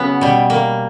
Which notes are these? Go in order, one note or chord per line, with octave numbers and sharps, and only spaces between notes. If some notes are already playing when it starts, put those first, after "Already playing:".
Already playing: C#3 F#3 B3 C#4
B2 G3
A#3